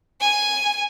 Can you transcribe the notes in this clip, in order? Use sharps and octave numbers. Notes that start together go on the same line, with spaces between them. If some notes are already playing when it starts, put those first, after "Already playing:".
G#5